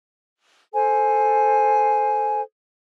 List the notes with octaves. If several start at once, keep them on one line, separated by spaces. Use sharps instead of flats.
A4 C5 G#5